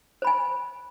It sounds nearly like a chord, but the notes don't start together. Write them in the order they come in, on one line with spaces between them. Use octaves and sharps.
C5 B5 G#5